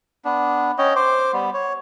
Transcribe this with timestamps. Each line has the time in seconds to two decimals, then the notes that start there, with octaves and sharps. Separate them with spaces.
0.25 B3 D4
0.78 C#4 C#5 D#5 G5
0.96 C5 D6
1.33 G3 B3
1.54 C#5